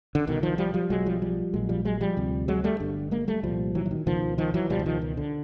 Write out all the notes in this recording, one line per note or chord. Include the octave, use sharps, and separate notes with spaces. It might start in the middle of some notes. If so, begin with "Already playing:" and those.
D3
C2 B2 D#3
D#3 F3
F3 G3
F3 G3
B1 B2 F#3 G#3
F3 G3
F3 G3
A#1 A#2 F#3 G#3
F3 G3
F#3 G#3
F3 G3
D2 C3
F#3 G#3
G3 A3
G1 G2 D3
G#3 A#3
G3 A3
C2 A#2 F3 G3
E3 F#3
E3
D#3
C#2 B2 D#3 F3
D#3 F3
E3 F#3
C#2 B2 F3 G3
E3
D#3 F3
D#3
D3